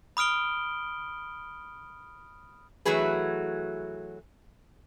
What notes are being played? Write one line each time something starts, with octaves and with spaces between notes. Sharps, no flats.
B5 D#6 F6 D7 G7
E3 F#3 A3 F#4 G#4 B4